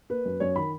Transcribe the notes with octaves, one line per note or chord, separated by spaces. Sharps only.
A#3 B4
F#2
F#2 C#5
D#3 B5